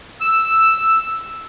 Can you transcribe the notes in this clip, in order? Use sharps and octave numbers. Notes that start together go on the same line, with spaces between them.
E6